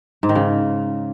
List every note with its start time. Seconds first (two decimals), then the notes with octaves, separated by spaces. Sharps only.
0.23 G#2
0.29 D#3
0.35 C#3